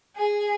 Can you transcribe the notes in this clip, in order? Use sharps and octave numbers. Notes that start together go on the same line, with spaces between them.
G#4